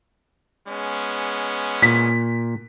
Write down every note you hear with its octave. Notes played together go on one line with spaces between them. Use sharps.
G#3 B3 C#4
A#2 B6